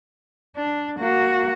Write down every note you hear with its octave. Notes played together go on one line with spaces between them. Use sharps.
D4
A#3 F#4